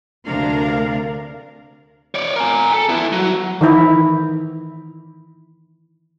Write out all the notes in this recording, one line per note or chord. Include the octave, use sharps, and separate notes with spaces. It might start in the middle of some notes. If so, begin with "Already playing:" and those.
D2 C3 D4 A#4 F5
C#5 D5
A#4 G#5
A4
B3 E4
F#3
D#3 E3 E4